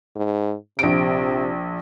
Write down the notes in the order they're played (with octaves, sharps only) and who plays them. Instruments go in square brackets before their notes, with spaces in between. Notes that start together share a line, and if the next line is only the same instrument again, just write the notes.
[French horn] G#2
[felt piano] A#1 D7 [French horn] C3